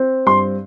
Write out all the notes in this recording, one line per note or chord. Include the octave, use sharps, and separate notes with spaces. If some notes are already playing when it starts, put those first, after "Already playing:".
Already playing: C4
G2 C6